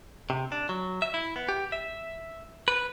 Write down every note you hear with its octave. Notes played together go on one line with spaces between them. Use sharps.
C3
D4
F#3
E5
E4
B3
G4
E5
B4